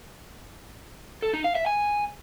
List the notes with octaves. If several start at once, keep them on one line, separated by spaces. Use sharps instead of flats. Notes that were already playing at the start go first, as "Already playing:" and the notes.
A4
D#4
F5
E5
G#5